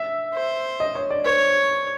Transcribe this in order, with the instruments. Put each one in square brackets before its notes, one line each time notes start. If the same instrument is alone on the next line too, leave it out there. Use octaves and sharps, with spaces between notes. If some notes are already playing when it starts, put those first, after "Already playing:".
Already playing: [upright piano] E5
[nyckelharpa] C5
[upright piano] D#5
C#5
D5
[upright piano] C5 [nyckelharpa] C#5